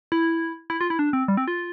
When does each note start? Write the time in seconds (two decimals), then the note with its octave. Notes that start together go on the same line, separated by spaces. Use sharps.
0.12 E4
0.70 E4
0.81 F4
0.90 E4
0.99 D4
1.13 C4
1.28 G3
1.37 C4
1.48 F4